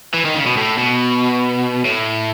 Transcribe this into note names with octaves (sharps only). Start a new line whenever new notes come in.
E3
D#3
C#3
B2
A2
B2
A2